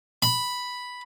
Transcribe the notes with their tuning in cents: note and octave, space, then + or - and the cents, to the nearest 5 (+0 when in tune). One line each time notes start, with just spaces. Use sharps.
B5 +0